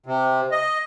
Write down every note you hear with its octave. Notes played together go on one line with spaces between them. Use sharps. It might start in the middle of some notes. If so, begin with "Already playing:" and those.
C3
D#5